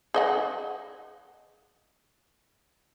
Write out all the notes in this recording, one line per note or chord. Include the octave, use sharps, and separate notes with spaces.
G#4 D#5 F#5